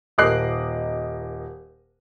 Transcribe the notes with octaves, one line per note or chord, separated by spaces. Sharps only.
D#1 A#4 D#5 D6 F#6 C7